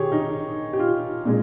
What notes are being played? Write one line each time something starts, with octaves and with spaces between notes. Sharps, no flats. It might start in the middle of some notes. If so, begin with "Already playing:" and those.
Already playing: D#3 G4 G#4 C#5
D#4
G4
F4
A#2 G#3